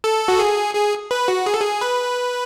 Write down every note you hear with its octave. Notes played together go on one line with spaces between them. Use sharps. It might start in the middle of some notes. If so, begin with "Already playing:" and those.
A4
F#4
G#4
G#4
B4
F#4
G#4
A4
G#4
B4